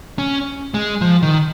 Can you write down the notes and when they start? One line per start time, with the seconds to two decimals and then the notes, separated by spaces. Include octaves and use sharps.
0.19 C#4
0.74 G#3
1.01 F3
1.22 D#3